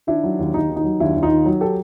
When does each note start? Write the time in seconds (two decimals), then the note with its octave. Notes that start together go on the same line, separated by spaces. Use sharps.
0.07 D#3 D4 E4
0.24 F#3
0.39 D#2
0.54 D#2 D#4
0.70 D#3
0.76 D#4
0.84 F#3
1.00 D#2 D4 E4
1.15 D#2
1.23 D#4 F4
1.30 D#3
1.46 F#3
1.61 G4 A4